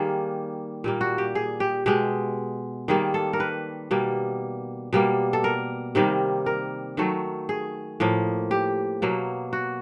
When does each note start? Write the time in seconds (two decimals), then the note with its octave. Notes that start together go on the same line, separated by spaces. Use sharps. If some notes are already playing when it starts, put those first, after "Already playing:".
Already playing: D#3 G3 A#3 G#4
0.84 A#2 G3 A#3
1.01 F#4
1.18 G4
1.35 G#4
1.60 G4
1.86 B2 G#3 G4
2.88 D#3 G3 A#3 G#4
3.14 A4
3.33 A#4
3.40 B4
3.91 B2 G3 A#3
4.93 B2 G3 A#3
5.33 A4
5.44 A#4
5.95 C3 D#3 G3 A#3
6.46 A#4
6.97 D#3 F#3 A3
7.49 G#4
8.00 A2 F3 A#3
8.51 G4
9.02 B2 F#3 A#3
9.53 F#4